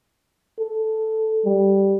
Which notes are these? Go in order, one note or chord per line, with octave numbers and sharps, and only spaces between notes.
A4
G3